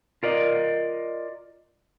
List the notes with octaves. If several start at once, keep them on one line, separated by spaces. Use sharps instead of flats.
F4 A#4 D5 D#5